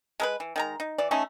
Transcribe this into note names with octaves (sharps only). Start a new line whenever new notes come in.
G#3 A#4 B4
E3
D#3 G#3 A#5
D#4
E3 D5
A3 C#4 D#4